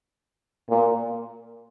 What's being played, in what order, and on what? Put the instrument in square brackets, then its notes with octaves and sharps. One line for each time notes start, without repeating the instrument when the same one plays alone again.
[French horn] A#2